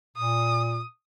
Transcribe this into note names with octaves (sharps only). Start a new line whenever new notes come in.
A#2 D#6